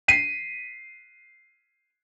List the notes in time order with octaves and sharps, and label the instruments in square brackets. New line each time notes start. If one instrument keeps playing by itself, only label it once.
[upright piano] B6 C7 D#7